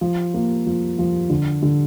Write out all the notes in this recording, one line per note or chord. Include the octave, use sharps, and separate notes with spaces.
F3
A#3
F3
F3
D3
D3